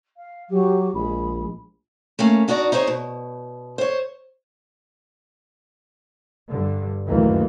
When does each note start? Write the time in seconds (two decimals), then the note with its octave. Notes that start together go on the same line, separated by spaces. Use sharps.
0.17 F5
0.50 F#3 G4
0.94 A#1 G#3 B5
2.19 A3 A#3 C#4
2.48 D4 D#4 F#4 A#4 D5
2.72 D#4 E4 G#4 C5 C#5
2.87 B2
3.78 C5 C#5
6.50 G2 D3
7.08 F#1 D2 A#2 D#3 E3 A#3